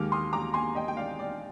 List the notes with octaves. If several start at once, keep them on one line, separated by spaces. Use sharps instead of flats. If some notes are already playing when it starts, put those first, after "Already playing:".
Already playing: D#2 D#3 G#3 D6 F6
C6 D#6
A#5 D6
G#5 C6
D#5 G5
G5
D5 F5
D5